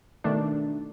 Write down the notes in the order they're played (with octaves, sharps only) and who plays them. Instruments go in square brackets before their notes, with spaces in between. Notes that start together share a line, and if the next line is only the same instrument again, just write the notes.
[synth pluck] B2 D#3 A3 D4